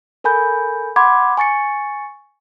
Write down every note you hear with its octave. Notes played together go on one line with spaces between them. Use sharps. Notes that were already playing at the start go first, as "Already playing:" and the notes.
A4 A#4 G#5 B5 G6
F#5 B5 C6 D6 G#6
G#5 C#6 A6 C#7